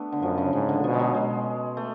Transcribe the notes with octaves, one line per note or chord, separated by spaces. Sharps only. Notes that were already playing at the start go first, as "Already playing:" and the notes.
Already playing: A3 B3 D4
D3
F#2 F3
C#3
G#2 C#3
D3
B2 F3
G#3
F#3
B2 G#3
A3